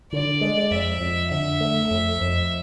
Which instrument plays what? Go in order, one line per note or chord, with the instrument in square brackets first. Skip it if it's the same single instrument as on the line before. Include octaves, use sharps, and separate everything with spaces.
[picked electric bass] D3 [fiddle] D5
[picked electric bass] G#3
[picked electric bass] F2 [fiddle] E5
[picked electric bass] F2
[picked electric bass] D3 [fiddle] E5
[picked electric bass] A3
F2
F2